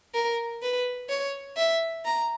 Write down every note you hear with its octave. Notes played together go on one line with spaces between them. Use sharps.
A#4
B4
C#5
E5
A#5